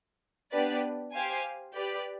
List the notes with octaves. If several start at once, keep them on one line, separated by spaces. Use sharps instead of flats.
B3 D4 G4 B4 D5
G4 C5 F5 G#5
G4 B4 D5